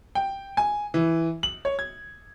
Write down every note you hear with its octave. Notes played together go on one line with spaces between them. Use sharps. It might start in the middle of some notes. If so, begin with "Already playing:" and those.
G5
G#5
E3
F#7
C#5
G#6